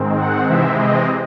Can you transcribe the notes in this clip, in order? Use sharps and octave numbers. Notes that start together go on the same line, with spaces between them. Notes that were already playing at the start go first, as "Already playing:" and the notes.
Already playing: G#2 D#3 G#3 C4
F#5
C3 E3 G#3 C4 E5
D#5